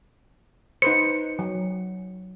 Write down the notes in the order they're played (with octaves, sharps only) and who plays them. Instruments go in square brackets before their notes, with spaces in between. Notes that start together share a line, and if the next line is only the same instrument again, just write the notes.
[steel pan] D#4 B4 C5 [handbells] C#7
[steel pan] F#3